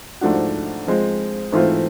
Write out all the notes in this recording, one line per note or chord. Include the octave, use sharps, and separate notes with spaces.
G#2 F3 A3 D4 F#4
F3 G#3 C4
G#2 E3 A3 C4 F4